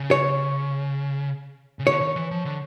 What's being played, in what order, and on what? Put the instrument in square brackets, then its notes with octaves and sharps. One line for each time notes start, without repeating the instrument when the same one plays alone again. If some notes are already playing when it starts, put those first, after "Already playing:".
Already playing: [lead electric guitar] C#3
[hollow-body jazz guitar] C#5
[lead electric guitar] C#3
[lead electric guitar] D3 [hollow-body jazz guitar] C#5
[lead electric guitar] D#3
E3
F3
D3